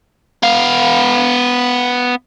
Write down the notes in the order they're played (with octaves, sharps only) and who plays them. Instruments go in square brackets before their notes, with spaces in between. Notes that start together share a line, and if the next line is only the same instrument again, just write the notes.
[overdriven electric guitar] B3 F5